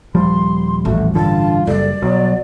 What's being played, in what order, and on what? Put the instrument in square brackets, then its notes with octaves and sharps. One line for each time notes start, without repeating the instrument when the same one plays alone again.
[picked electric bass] D#1 F3 G3 [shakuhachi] C6
[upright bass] A1 [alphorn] A3 [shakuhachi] F#4
[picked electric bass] G2 D3 [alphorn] F4 [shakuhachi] A5
[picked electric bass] F#1 [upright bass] G3 [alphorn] A4 [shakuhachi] D5
[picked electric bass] B1 [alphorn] F#3